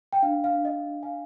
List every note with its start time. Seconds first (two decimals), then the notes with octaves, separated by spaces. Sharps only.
0.13 G5
0.22 D4 F5
0.44 F5
0.54 D4
0.65 D#5
0.87 D4
1.03 F5 G#5